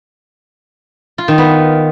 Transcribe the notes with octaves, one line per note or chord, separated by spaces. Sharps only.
F4
D#3
B3